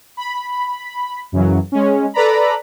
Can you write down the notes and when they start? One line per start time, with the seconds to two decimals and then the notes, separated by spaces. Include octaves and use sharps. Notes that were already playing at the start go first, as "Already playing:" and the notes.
0.17 B5
1.32 F#2 C#3 E3 F#3
1.72 G#3 C#4
2.14 A4 B4 D5 A#5 B5